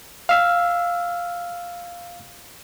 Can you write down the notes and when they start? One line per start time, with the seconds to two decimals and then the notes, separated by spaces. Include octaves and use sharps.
0.29 F5 E6 F6